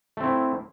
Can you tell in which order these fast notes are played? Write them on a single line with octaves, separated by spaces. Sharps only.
A3 C4 E4